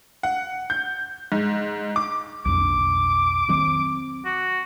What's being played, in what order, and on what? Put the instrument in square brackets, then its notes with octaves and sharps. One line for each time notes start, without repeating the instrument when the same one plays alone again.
[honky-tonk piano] F#5
G6
G#2
D6
[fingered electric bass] B1 F2 D4 [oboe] D6
[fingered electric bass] D#3 F#3 C4
[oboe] F#4